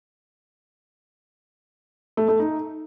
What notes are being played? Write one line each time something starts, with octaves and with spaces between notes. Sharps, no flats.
A3
A3
D#4